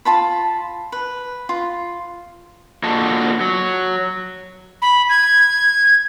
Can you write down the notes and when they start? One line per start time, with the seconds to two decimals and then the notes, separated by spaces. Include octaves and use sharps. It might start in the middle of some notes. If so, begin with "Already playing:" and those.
0.05 F4 A5 B5
0.92 B4
1.49 F4
2.83 D3 A#3 F4 F#4 D#5 A5
3.41 F#3
4.82 B5
5.09 G#6